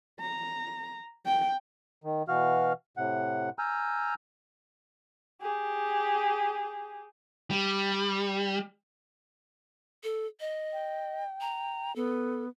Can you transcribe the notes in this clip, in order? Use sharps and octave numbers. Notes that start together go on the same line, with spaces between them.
A#5
G5
D#3
B2 E3 F#4 F5 F6
A2 C3 F#5
G#5 A#5 E6 F6 G6
G4 G#4
G3
A4
D#5
G5
A#5
B3 A4